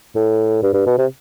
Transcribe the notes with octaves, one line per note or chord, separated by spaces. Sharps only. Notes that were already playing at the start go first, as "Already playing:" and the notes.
A2
G2
G2
B2
C3